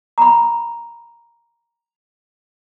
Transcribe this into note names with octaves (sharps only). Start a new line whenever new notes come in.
A#5 B5